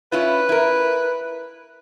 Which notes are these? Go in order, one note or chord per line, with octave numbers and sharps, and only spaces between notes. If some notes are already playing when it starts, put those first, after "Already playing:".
C#4 E4 F4 B4
E4 A#4